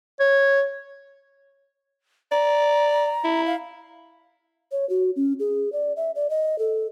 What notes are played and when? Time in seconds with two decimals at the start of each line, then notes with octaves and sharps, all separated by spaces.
0.20 C#5
2.31 D5 A#5
3.24 E4
3.46 F5
4.72 C#5
4.90 F#4
5.16 C#4
5.40 G#4
5.72 D5
5.97 E5
6.15 D5
6.30 D#5
6.59 A4